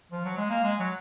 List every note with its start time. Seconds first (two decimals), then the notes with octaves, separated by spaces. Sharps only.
0.12 F3
0.25 F#3
0.37 G#3
0.50 A#3
0.64 G#3
0.79 F#3